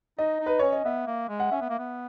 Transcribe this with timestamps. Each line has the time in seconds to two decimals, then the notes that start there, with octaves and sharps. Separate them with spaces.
0.18 D#4 D#5
0.40 D#4
0.46 B4
0.59 C#4 C#5
0.72 D#5
0.85 B3 E5
1.07 A#3
1.29 G#3
1.40 F#5
1.52 C#4 E5
1.61 B3
1.69 A#3
1.79 B3